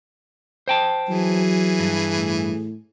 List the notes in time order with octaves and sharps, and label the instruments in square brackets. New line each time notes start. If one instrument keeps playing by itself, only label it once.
[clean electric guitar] C5 G5 A5
[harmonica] E3 G#4 [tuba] F#3
[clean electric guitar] G2
[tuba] A2